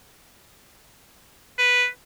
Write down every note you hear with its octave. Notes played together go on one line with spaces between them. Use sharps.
B4